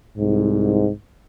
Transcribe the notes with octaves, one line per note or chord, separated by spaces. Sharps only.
C2 G#2